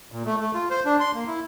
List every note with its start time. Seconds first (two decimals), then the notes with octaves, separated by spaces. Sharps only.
0.12 A#2
0.26 A3
0.40 A3
0.54 F4
0.70 C5
0.85 D4
1.00 C6
1.15 A#3
1.27 E4